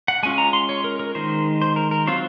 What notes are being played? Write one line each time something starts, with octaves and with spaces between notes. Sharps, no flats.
F#5
G#3 C#4 F4 G#5
A#5
C6
C#5
A#4
A#4
D#3 G#3 D#4 C5
C5
A#4
A#4
F#3 C4 F4 C5